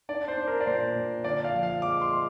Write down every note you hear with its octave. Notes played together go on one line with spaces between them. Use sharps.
D4 D5
C5
D4
A#4
D5
A#2 C5
A#2
D3 D5
F5
F3
F5
G#3 D6
C6
G#3